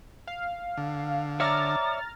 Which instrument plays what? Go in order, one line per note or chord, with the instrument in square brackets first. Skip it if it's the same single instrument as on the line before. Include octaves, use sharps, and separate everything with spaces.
[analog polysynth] F5
[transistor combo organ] D3
[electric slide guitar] C#5 D5 E5 [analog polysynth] A#5 F6 A6 [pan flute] D6